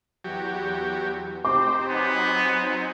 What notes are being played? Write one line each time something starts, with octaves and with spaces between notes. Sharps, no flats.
E2 F#3 G4
C4 D#4 G4 C5 D6
F#3 B3 D#4 G#5